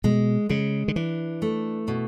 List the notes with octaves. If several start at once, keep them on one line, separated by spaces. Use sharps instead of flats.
B2 G#3
C#3 G#3
D3
E3 D4
A3
B2